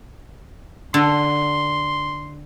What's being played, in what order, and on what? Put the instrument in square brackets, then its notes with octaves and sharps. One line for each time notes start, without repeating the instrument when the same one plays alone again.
[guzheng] D3 [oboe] C6